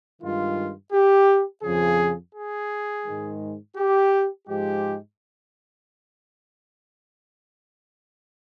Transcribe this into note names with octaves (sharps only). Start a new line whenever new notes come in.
G2 D#3 G#3 F4
G4
F2 C#3 F3 G#4
G#4
G#2 D#3 G#3
G4
G#2 F3 G#3 G4